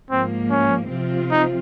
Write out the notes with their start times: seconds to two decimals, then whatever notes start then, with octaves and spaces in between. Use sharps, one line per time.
0.11 G#2 F3 A#3 C4
0.51 C#4
0.91 C3 F3 C4 F4
1.31 D#4